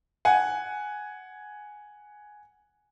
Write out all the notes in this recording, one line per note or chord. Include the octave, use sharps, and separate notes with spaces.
F#5 G#5